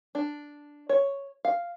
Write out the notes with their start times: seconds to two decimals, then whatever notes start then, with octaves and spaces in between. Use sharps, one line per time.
0.15 D4
0.89 C#5
1.45 F5